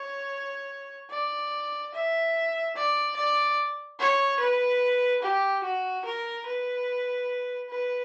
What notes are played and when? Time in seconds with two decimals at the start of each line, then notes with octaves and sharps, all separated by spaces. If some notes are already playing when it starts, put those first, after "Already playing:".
Already playing: C#5
1.11 D5
1.94 E5
2.76 D5
3.16 D5
4.00 C#5
4.39 B4
5.22 G4
5.63 F#4
6.05 A#4
6.46 B4
7.70 B4